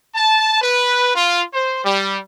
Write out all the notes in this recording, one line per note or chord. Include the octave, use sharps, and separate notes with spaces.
A5
B4
F4
C5
G3